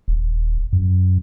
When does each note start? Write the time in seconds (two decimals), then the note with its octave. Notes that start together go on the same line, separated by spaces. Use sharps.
0.08 D#1
0.73 F#2